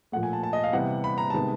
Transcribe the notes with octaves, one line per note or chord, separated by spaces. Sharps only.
A#2 F3 A3 F#5
G#5
A5
A5
D#5
F5
C3 E3 G3 B3 F#5
B5
A#5
C3 D#3 G#3 B3 A5